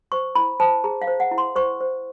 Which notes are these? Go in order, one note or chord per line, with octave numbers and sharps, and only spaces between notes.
C5 C#6
E4 B5
C5 A5
G#4 A#5
F5
C5
F#5
E4
C6
C5 C#6
C5